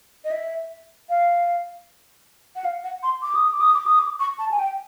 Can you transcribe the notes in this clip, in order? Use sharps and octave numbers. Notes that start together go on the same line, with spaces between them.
D#5
E5
F5
F#5
F5
F#5
C6
D6
D#6
D6
D#6
D6
D#6
D6
C#6
A5
G#5
G5